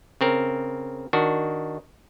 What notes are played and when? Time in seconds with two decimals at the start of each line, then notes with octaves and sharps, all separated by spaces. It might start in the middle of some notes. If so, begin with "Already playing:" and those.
0.21 C#3 C4 A#4
1.13 D#3 D4 F#4